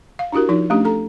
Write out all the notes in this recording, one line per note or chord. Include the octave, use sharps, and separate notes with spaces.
F5
D4 E4 F#4 G4 A#4
F3 D#4 F4
A3 C#4 D4 G4
A4 A#5